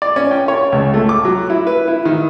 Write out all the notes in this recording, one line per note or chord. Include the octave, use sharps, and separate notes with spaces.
D5
C#4
G5
C#5
C#2
A3
D6
F#3
E4
B4
E4
D#3